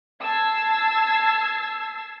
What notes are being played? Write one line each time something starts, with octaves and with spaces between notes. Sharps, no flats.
A5 E6 G#6 A6 C7